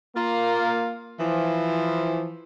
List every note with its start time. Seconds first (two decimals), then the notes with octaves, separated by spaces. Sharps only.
0.15 A#3 F4
1.20 E3 F3